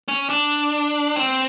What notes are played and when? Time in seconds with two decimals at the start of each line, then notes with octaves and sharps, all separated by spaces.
0.08 C#4
0.30 D4
1.16 C4